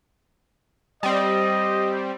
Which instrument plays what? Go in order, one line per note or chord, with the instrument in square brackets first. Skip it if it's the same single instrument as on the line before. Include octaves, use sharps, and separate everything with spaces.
[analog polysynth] G3 C4 [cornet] D#5